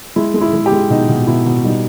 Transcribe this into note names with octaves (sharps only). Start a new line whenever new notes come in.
G#3 E4
G#3
E4
G#3
G4
G#3
B2 D#4
B2
B2 E4
B2
G3 D#4